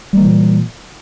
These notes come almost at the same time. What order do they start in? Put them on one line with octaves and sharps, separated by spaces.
G3 A#3 E3 A#2